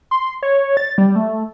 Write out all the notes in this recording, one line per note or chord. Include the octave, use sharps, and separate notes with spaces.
C6
C#5
A6
G3
A3